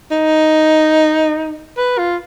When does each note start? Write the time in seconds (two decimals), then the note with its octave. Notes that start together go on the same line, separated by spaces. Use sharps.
0.11 D#4
1.77 B4
1.98 F4